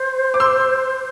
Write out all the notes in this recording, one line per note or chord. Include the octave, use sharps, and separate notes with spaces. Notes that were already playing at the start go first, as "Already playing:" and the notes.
Already playing: C5
D6
C6 E6